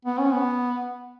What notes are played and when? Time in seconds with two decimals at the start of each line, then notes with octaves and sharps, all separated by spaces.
0.05 B3
0.19 C#4
0.33 B3